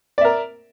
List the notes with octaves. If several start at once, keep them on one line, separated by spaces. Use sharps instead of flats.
A#4 D5 E5